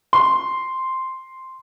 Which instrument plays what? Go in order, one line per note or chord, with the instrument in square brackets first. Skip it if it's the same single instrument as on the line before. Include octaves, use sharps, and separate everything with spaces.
[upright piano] C6